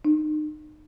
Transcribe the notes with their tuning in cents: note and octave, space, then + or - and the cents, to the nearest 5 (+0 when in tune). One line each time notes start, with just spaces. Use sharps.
D#4 -35